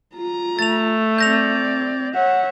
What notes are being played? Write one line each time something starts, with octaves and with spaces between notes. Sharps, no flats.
F4 A#5
A3 A6 F7
C4 D5 G6 A#6 F7
C#5 E5 F#5